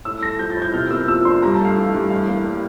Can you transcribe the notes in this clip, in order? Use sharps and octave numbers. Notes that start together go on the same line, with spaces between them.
A2 E6
A3 A#6
F3 G6
A6
A2
G6
C3 F6
A#3 E6
F3 E6
D4 C6
G2 A#5
A5
A3 F5
E3
G2
A2 F5
A#3
G3